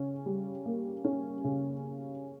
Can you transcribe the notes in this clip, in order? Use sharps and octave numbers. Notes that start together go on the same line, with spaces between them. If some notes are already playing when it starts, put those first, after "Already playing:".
Already playing: C#3 C#4
G3
A#3
C#4
C#3